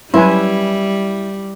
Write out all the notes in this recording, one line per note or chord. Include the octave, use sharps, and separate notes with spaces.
F#3 G3 C#4 E4 B4 G#5